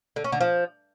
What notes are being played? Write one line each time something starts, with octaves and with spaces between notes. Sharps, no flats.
D3
C#4
D3
F3